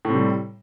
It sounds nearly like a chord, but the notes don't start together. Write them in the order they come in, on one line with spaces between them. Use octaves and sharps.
A2 C3 G3